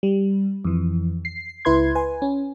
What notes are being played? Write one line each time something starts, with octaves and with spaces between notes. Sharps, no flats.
G3
F2 E3
C7
C#2 E4 B4 C6 G#6
B4 G#5
C#4